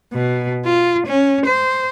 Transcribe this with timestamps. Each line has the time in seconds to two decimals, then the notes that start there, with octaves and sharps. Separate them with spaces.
0.13 B2
0.65 F4
1.06 C#4
1.46 C5